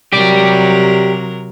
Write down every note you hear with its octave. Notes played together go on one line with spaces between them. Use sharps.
C3 F#3 G4 A#4 D5